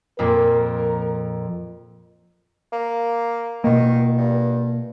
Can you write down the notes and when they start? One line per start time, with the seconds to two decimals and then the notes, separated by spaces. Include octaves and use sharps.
0.19 F2 A#2 A#3 A#4
2.72 A#3
3.64 B2 D#3 A#3
4.18 G2